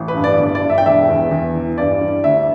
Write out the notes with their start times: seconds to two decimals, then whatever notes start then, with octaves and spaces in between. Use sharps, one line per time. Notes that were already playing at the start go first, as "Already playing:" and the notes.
Already playing: A1
0.08 B4
0.16 G2
0.24 D5
0.39 G1
0.55 D5
0.62 G2
0.70 E5
0.78 G5
0.86 E1 E5
1.08 E2
1.31 E2
1.55 E3
1.78 G2 D5
2.01 G3
2.24 D2 E5